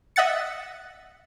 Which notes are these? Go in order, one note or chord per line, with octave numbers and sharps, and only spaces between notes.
D#5 E5 F#5 A6 C#7